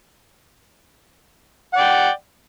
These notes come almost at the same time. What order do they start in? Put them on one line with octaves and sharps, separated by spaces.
F#5 D5 G5